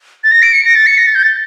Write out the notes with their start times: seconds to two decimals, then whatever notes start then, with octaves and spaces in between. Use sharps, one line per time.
0.24 A6
0.31 A#6
0.42 D7
0.53 C#7
0.65 A#6
0.75 A6
0.87 C#7
0.98 A#6
1.07 A6
1.15 G6
1.23 A6